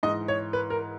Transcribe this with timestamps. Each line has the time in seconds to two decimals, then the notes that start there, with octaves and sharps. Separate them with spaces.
0.03 G#2 D#5
0.07 E3
0.28 C#5
0.53 B4
0.70 A#4